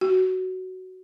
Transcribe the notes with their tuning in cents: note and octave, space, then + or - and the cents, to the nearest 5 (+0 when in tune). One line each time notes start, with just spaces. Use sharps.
F#4 +10